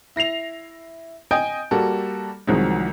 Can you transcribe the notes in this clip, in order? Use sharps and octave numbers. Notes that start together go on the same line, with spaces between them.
E4 A#6 C7 F7
D#5 G5 G#5 D#6 G6 D7
G3 A#3 F#4 A4
C2 D#3 F3 F#3 G#3